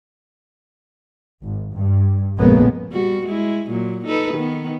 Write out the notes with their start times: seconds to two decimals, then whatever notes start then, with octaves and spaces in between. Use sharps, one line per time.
1.42 G#1
1.74 G2
2.37 A#1 F2 C#3 G#3 A#3 B3
2.92 G3 F#4
3.27 G#3 E4
3.70 A#2 F#3
4.06 D#4 A4 B4
4.34 D#3 B3